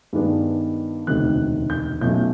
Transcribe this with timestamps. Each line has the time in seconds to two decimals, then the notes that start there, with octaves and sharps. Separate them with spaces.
0.13 G2 D#3 G#3 B3 D4
1.07 E1 D2 C3 D#3 F#6
1.70 G6
2.01 B1 B2 F#3 A3 C#4 G6